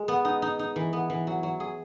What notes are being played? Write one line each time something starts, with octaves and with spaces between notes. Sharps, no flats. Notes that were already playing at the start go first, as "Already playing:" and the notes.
Already playing: G#3
B3
D#4
D#4
D#4
E3
B3
E3
F#3
F#3
G#4